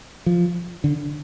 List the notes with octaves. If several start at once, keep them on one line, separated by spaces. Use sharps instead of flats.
F3
D3